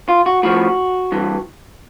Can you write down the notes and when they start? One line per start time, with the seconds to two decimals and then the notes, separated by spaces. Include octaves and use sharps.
0.09 F4
0.26 F#4
0.43 A2 F3 F#4
1.12 G2 E3